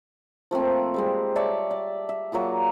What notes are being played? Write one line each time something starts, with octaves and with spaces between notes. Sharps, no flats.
F3 A3 A#3 C4
G3 G#3 C4
C#5 D5 E5 A5
D5
E5
F#3 A#3 F4 G#4